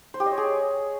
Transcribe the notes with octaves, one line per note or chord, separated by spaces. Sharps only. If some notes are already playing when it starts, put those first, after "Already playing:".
C5
G4
D#5
C#5
G#4